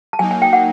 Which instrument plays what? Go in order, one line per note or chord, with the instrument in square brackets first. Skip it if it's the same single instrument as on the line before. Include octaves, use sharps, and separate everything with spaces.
[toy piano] A5
[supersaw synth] F#3 A#3 D#4 [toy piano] G#5
[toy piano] G#5
G5
F#5